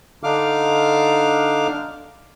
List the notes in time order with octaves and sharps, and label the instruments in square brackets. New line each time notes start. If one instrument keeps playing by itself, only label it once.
[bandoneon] D3 D4 D#4 F5 D6 F6